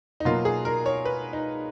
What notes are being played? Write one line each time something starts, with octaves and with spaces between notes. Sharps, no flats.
D#4
B2 F#3 A#3 F4
G#4
A#4
C#5
B4
D#4